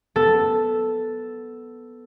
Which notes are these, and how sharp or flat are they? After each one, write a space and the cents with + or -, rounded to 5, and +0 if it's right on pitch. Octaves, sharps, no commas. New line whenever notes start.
B3 +0 A4 +0